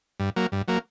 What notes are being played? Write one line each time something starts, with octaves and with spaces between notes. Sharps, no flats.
G2
F#3 A#3
G2
F#3 A#3